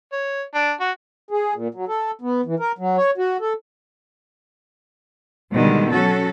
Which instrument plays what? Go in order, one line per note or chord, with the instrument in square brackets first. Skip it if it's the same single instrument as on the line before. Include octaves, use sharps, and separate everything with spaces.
[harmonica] C#5
D4
F#4
[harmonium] G#4
A#2
F#3
A4
B3
E3
A#4
F#3
C#5
F#4
A4
[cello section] B2 D3 D#3 G3 G#3
F#3 C#4 F#4 A4